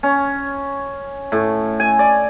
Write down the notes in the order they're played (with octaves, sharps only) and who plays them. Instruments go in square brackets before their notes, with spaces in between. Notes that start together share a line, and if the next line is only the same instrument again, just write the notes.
[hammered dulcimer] C#4
A2
G#5
D5